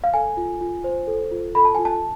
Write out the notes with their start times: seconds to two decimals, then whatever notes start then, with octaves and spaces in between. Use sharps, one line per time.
0.04 F5
0.14 A4 G#5
0.37 F4
0.61 F4
0.84 C5
1.07 A4
1.31 F4
1.55 A4 B5
1.65 A5
1.75 F4 G#5
1.85 A5